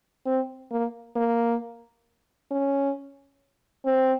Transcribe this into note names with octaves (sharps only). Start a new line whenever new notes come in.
C4
A#3
A#3
C#4
C4